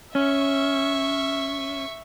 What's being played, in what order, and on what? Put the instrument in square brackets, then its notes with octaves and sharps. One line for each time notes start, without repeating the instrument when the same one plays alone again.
[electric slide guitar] C#4 [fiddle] E5 C#6